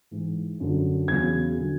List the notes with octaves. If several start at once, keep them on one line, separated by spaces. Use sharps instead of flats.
G#2 E3
F#2 D3 F#3
E2 C#3 F#3 G#6
D3 F#3